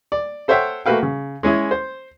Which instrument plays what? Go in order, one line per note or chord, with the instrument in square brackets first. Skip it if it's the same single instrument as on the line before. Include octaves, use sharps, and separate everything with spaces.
[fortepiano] D5
A4 C5 C#5 E5 F#5 G5
A3 A#3 F#4 B4 F5 G5
C#3
G#3 C#4 E4 G#4
C5